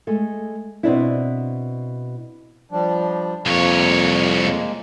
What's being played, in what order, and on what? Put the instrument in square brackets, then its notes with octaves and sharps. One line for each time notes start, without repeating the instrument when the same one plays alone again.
[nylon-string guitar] G#3 A3 A4
B2 C4 D4 E4
[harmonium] F3 G3 D4
[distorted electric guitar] C2 C#5 [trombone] F2 [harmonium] A#3
[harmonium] G#3 A#3